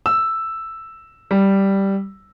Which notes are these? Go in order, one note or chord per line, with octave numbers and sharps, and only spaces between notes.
E6
G3